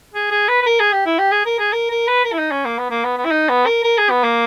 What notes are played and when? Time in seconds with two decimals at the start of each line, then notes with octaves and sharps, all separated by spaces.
0.14 G#4
0.31 G#4
0.48 B4
0.62 B4
0.66 A#4
0.80 G#4
0.93 G4
1.06 E4
1.18 G4
1.32 G#4
1.45 A#4
1.59 G#4
1.73 A#4
1.90 A#4
2.08 B4
2.24 A#4
2.32 E4
2.39 D#4
2.51 C#4
2.65 A#3
2.78 B3
2.91 A#3
3.04 B3
3.18 B3
3.25 E4
3.31 D#4
3.49 B3
3.66 A#4
3.84 A#4
3.98 G#4
4.10 B3
4.23 A#3